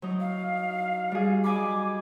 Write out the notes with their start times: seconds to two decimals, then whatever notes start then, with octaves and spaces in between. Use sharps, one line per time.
0.02 F#3 D#4 E4
0.20 F5
1.11 G3 F#4 G#4
1.44 D#5 G#5 B5 D6